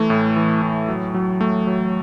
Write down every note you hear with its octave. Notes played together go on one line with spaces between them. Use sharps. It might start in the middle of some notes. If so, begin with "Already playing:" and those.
Already playing: E3 A3
A2
E3
A2
F#3
F#3
F#3 A3
F#3